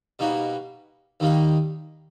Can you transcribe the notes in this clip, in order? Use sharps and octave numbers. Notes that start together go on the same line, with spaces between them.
B2 G3 A#3 D#4 F#4
D#2 D#3 G3 A#3 D#4